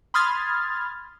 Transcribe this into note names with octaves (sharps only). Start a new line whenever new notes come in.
B5 C6 D#6 F6 G#6 A6